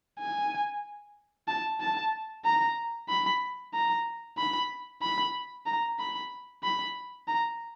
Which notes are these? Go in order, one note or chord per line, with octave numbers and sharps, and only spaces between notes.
G#5
A5
A5
A#5
B5
A#5
B5
B5
A#5
B5
B5
A#5